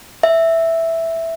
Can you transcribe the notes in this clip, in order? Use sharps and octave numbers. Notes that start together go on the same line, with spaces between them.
E5